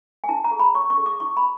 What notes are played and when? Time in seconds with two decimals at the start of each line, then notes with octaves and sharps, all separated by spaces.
0.24 G#5
0.29 E4 A5
0.44 A#5
0.51 G#4
0.59 B5
0.75 C#5 C#6
0.90 C#6
0.98 G#4
1.06 D6
1.20 E4 C#6
1.37 B5